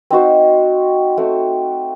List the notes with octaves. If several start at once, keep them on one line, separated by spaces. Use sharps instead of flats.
C4 D#4 F#4 C5
A3 C4 F#4